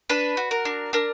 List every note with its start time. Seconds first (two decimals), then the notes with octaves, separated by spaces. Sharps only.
0.09 D4 B4
0.37 F#4
0.51 A#4
0.65 D4
0.93 D4 A#4